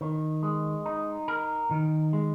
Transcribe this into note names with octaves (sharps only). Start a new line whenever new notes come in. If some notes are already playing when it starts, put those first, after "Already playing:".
D#3
G#3
D#4
A#4
D#3
G#3